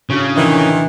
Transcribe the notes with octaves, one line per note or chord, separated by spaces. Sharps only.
A2 C#3 D4 F#4
F1 D#3 E3